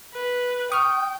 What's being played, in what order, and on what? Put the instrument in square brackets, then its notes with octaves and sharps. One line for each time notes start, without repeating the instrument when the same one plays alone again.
[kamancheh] B4
[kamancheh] G5 [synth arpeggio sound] C#6 F6 [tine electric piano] D#6